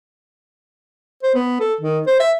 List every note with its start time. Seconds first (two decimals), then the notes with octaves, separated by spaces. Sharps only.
1.23 C5
1.35 B3
1.60 A4
1.81 D#3
2.07 C5
2.20 E5